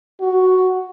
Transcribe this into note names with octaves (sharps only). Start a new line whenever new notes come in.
F#4